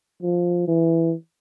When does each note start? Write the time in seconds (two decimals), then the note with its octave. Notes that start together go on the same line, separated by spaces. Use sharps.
0.23 F3
0.68 E3